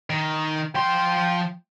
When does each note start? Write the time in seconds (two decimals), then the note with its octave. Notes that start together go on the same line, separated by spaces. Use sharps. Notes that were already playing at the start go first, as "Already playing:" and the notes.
0.10 D#3
0.75 F3 G5 C6